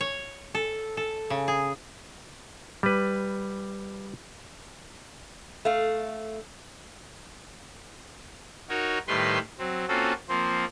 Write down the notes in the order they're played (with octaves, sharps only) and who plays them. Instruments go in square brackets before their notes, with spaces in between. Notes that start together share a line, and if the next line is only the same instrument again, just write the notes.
[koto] C#5
A4
A4
C#3
G#4
[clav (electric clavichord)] G3 B4
[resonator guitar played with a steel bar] A3 F5
[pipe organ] D#4 F#4 A#4 C#5
A2 D#3 G3 B4 G5 C6
F#3 C4
A#3 C4 C#4 F4 F#4 A4
F3 A#3 C4 C5